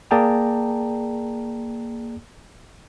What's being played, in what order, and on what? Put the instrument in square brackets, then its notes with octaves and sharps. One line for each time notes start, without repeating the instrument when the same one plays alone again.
[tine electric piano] A#3 G#4 D5 G5 A5 A#5